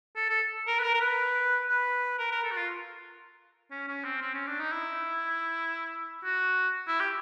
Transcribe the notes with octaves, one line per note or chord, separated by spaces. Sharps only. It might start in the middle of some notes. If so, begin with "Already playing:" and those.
A4
A4
A#4
B4
A#4
A#4
B4
B4
A#4
A#4
A4
F#4
F4
C#4
C#4
C4
C4
C#4
D4
D#4
E4
F#4
E4
G4